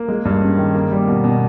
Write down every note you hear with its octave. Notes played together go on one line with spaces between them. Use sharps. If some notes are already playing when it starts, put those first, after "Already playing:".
Already playing: A#3
G#3
G2
C#4
D#3
A#3
G3
B2
B2